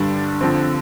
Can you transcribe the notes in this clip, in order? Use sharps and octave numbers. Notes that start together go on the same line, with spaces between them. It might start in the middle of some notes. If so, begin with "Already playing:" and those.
Already playing: G2 D3 G3 D4
D3 F3 C4